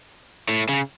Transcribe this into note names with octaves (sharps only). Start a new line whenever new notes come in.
A2
C#3